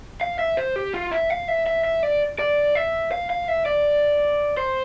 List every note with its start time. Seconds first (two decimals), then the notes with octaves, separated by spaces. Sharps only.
0.21 F5
0.39 E5
0.57 C5
0.76 G4
0.94 F4
1.11 E5
1.30 F5
1.48 E5
1.66 E5
1.84 E5
2.03 D5
2.39 D5
2.75 E5
3.12 F5
3.30 F5
3.48 E5
3.66 D5
4.57 C5